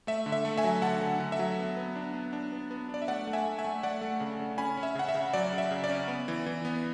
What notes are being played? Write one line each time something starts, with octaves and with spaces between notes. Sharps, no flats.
A3 E5
D3
E5
A3
E5 G#5
F#3
D3 F#5 A5
D3
D3
E5
F#3
B3
B3
D4
B3
D4
B3
B3
D4 D5
E5
A3 D5 F#5
A3
E5 G#5
A3
E5 G#5
A3
A3 D5 F#5
A3
C#3
C#3
C#4 G#5 B5
C#4
E5
C#3 F#5
E5
C#3
F#3 D5
C#3
E5
C#3
D5
C#4
B3
E3
E3
B3